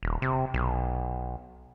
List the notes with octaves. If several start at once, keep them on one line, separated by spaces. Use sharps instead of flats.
D#1
C3
B1